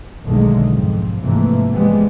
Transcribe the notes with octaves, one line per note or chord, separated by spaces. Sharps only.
B1 E2 D3 D#3 G#3 A3
F2 G#2 F3
G#2 C3 E3 F3 A3 A#3
E3 F3 G3 G#3 B3